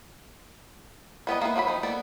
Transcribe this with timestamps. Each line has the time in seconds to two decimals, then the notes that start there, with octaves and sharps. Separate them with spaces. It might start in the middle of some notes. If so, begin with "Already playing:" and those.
1.27 G3 B3 A4 D#5
1.41 A#3 B3 E4 B4
1.56 F3 F#3 A4 B5
1.67 D#3 F3 D#4
1.83 A#3 B3 A4 D5